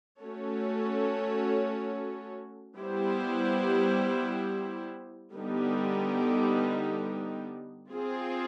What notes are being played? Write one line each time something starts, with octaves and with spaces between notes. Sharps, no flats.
A3 C#4 F#4 A4 C#5
G3 B3 E4 G4 C5
D3 G3 B3 D#4
C4 F4 G#4